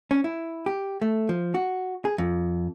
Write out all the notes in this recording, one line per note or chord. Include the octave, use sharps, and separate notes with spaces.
C#4
E4
G4
A3
F3
F#4
G#4
F2